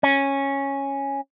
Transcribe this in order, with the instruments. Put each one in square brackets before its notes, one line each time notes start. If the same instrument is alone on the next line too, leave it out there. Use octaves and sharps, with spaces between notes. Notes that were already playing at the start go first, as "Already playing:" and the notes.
[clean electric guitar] C#4